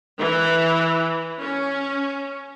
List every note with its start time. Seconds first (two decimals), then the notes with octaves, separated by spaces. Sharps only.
0.18 E3
1.41 C#4